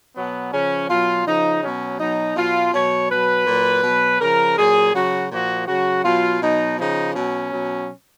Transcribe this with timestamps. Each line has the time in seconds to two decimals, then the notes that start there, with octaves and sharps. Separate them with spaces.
0.16 B2 F#3 B3
0.53 C#3 F3 C#4
0.90 B2 F#3 F4
1.26 C#3 F3 D#4
1.62 B2 F#3 C#4
1.99 B2 F#3 D#4
2.36 B2 F#3 F4
2.74 B2 F#3 C#5
3.10 B2 F#3 B4
3.47 A#2 F#3
3.83 B2
3.88 F#3
4.21 C#3 F3 A#4
4.58 A#2 F#3 G#4
4.94 C#3 F#3 F#4
5.30 A#2 F3 F#4
5.67 C#3 F#3 F#4
6.04 B2 F#3 F4
6.42 B2 F#3 D#4
6.78 C#3 F3 D#4
7.15 B2 F#3 C#4
7.52 B2 F#3